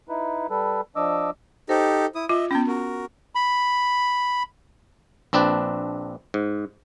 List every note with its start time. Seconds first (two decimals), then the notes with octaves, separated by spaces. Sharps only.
0.09 D#4 E4 B4
0.50 G3 A4 B4
0.96 F3 D4 D#5 D6 E6
1.69 D#4 G4 A4 C5
2.15 E4 D#6
2.29 F4 D#5 E5
2.51 B3 C#4 G5
2.68 F#4 A#4
3.35 B5
5.33 A#1 C4 D4 B4 A5
6.34 G#2